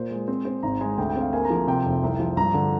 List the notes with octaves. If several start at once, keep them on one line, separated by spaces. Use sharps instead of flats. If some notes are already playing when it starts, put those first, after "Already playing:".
Already playing: A#2 C5
G#3
C4
C4
G#1 A#5
G#3 G#5
D2 G5
G5
C4
F5
A#3 G#5
A#5
F3
G#5
C3 G5
F1
C2
F3
G2 A#5
D3